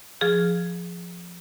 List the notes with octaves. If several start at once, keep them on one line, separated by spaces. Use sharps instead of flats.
F3 G#4 F6